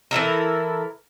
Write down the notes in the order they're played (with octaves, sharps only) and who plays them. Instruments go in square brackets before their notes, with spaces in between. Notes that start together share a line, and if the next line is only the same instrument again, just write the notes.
[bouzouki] E3 E4 A4 A#4